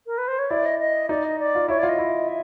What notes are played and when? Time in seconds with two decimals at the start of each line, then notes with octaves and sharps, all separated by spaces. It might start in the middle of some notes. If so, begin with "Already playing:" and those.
0.06 A#4
0.18 B4
0.28 C5
0.38 C#5
0.50 E4 D5
0.65 D#5
0.79 D#5
1.09 D#4 D5
1.24 D#5
1.39 D5
1.55 F4
1.68 E4 C#5
1.79 F4 D5
1.89 D#5
1.99 E4
2.28 E5